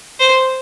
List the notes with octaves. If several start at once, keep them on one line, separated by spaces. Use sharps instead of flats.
C5